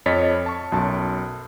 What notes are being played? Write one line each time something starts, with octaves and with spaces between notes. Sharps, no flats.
F2 C#5 D#5 A6 B6
A5 C#6
B1 F#2 A5